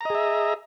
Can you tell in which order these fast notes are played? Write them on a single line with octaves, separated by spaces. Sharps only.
A#5 D#5 G#4 E5